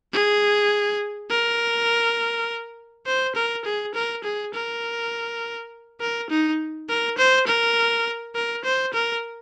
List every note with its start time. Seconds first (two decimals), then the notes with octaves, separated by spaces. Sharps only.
0.13 G#4
1.30 A#4
3.06 C5
3.36 A#4
3.65 G#4
3.95 A#4
4.24 G#4
4.53 A#4
6.01 A#4
6.30 D#4
6.89 A#4
7.18 C5
7.47 A#4
8.35 A#4
8.65 C5
8.94 A#4